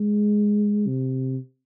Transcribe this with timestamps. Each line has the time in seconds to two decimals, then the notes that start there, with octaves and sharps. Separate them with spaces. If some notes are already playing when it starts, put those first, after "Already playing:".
Already playing: G#3
0.87 C3